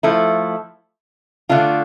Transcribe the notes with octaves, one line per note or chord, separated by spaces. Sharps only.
F3 A3 E4
D3 A3 D4 F4